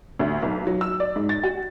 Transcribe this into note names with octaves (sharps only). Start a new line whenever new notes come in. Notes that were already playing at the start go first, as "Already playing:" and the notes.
D2
B1
F#3
E6
D5
G#2
A6
F#4